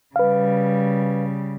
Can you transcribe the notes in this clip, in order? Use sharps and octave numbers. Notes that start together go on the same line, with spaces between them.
C#3 G3 B4 F5